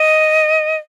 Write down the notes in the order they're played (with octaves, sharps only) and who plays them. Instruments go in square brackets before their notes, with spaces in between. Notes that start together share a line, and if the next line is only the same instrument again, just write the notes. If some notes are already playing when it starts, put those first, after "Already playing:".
Already playing: [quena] D#5